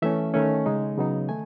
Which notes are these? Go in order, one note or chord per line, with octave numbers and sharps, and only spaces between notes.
E3 A3 C#4 E5
D#3 A3 C#4
C#3 G#3 D#4
C#3 F#3 B3 D#4
D#3 A3 G#5